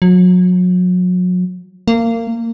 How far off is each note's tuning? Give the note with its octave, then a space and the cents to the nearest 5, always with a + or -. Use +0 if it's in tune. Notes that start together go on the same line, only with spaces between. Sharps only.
F#3 -35
A#3 -25